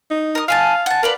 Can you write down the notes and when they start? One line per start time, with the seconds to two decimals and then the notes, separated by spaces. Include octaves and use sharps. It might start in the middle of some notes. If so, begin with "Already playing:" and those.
0.10 D#4
0.35 A#4 D#6
0.48 E5 F5 G#5 A5
0.86 F#5 A5
1.03 A#4 B4 D5 F5